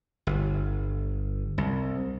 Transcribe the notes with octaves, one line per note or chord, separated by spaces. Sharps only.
G1
C2